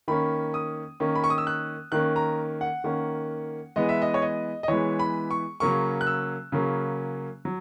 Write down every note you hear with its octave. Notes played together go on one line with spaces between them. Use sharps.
D#3 A#3 C#4 B5
D#6
D#3 A#3 C#4
B5
C#6
D#6
E6
F#6
D#3 A#3 C#4 F#6
A#5
F#5
D#3 A#3 C#4
E3 G#3 B3 D#5
E5
D#5
C#5
D#5
D#5
E3 G#3 B3 C#5
B5
C#6
C#3 F#3 A#3 C#4 C#6
F#6
E6
C#3 F#3 A#3 C#4
F#3